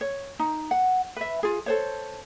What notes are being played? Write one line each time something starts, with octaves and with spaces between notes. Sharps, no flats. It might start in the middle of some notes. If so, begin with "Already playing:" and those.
C#5
D#4
F#5
B4 E5
F4 G#4
A4 C5 C#5